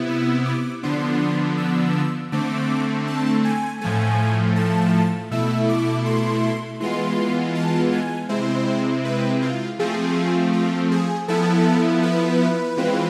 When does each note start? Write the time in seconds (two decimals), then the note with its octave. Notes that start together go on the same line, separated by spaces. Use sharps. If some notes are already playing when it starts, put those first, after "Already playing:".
Already playing: C3 B3 E4
0.09 E6
0.46 D6
0.83 D3 F3 B3 D4 C6
1.58 E6
2.32 D3 A3 C4 D6
3.07 A5
3.45 G#5
3.81 A2 F3 A3 G#5
4.56 A5
5.31 B2 A3 E4 E6
5.69 D6
6.06 C6
6.80 E3 G#3 B3 F4 C6
7.55 A5
7.92 G#5
8.29 C3 G#3 C4 E4 C5
9.05 B4
9.42 F4
9.79 F3 A3 C4 F4 G#4
10.53 F4
10.91 G#4
11.28 F3 B3 E4 A4
12.03 B4
12.77 E3 G#3 C4 F4